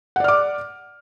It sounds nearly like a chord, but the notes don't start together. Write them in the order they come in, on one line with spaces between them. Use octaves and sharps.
F#5 D5 F6 D6